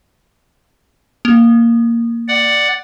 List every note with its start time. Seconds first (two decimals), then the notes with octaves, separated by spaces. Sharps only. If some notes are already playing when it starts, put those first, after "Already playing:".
1.25 A#3
2.28 D5 F#5